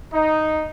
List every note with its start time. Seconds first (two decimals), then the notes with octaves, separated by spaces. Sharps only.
0.13 D#4